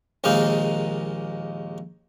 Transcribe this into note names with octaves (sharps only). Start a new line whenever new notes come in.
A#1 D#2 G#3 A#3 D#4